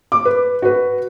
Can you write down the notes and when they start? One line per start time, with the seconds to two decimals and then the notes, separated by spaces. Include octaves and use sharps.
0.12 D6
0.25 B4
0.62 F#4 B4